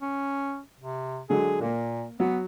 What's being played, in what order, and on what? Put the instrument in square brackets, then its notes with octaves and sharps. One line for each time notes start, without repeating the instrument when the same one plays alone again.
[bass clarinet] C#4
C3
[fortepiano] D3 F#3 G#3 [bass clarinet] G#4
[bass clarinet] A#2 [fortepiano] A#3
[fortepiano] F#3 [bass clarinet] B3